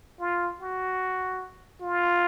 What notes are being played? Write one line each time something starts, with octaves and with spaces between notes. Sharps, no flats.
F4
F#4
F4